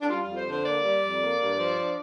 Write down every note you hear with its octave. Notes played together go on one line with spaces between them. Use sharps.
D4
G3 F4
F2 F4
C5
D3
C5
A#3 D5
G3
F2
A#3
G2
F3
D4